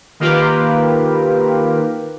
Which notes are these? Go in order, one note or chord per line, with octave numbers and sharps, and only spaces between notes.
D#3 A#3 F4 G4 A#4 B4